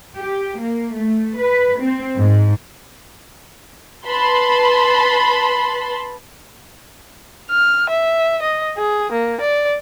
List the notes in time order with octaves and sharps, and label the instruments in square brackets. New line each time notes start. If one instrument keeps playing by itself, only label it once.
[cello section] G4
A#3
A3
B4
C4
G#2
[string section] B4 A5 B5 C6
[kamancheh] F6
E5
D#5
G#4
A#3
D5